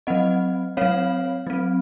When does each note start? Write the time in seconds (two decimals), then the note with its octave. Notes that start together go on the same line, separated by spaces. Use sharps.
0.07 F#3 C4 D#5 F#5
0.77 F#3 C4 C#5 F5
1.47 F#3 C4